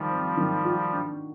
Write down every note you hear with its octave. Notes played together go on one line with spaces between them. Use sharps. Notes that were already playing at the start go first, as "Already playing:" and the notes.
Already playing: D#3 F3 G3
C4
D#3
F#4
D4